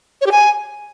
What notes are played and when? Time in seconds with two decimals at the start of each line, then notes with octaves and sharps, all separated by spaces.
0.21 C#5
0.26 G4
0.32 G#5